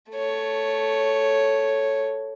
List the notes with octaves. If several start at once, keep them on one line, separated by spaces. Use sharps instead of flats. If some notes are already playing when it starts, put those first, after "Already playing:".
A3 C#5